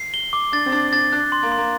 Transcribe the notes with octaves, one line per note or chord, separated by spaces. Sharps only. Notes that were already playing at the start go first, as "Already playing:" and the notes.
Already playing: C7
G7
D6
D4 A6
C4
D4 A6
D4 A6
D4 F#6
C6
A#3
C6
A#3